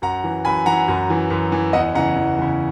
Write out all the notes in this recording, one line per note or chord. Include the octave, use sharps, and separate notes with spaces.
F#2 F#5 A#5
E3
F#2 G#5 B5
E3 F#5 A#5
F#2
E3
F#2
E3
E2 D#5 F#5
C#3 E3 F#5 A#5
E2
C#3 E3